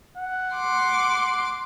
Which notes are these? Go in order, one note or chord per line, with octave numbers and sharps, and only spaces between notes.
F#5
C6 D6